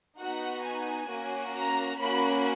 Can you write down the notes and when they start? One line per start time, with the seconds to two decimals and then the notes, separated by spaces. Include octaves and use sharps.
0.18 B3 D#4 F#4 F#5
0.63 G#5
1.08 A#3 C#4 F#4
1.53 A#5
1.98 A#3 C#4 F#4 B5